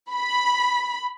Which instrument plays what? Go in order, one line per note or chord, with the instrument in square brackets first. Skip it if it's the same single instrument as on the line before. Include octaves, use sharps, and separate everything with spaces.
[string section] B5